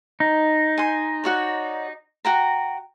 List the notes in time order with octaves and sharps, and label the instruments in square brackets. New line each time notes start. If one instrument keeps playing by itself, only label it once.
[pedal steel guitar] D#4
[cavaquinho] G#5 C6
F#4 C#5 D5
F#4 G5 A#5